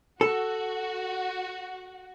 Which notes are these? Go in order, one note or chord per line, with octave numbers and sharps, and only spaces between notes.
F#4 A4